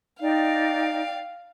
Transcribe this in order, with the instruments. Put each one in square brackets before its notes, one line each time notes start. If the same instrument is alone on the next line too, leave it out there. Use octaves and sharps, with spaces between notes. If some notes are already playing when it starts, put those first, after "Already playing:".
[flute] D#4 [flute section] D5 G5 [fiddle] F5